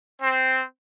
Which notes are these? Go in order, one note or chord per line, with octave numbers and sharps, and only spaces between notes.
C4